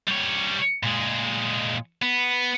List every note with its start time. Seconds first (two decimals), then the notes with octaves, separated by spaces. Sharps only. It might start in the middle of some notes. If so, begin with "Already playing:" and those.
0.07 G3 C#5
0.83 A#2 G#3
2.02 B3